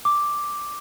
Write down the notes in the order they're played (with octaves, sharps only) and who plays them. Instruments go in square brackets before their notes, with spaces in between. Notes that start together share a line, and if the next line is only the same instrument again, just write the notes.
[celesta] D6